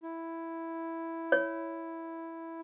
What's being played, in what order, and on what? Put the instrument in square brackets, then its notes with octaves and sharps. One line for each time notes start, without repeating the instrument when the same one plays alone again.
[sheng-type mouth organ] E4
[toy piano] C#5